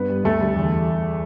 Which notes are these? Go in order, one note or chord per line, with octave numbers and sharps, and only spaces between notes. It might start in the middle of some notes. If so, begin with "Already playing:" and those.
Already playing: G2 B3 B4
G3
D2 A3 A4
D3 G3
E2